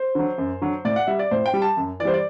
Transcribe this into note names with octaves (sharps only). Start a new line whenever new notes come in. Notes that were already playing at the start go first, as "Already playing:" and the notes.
Already playing: C5
D3 F#3
F#2
D3 F#3
A2 D5
F#5
G3 E5
D5
A2 C5
G5
G3
A5
F#2
E3 D5
G3 C5
D5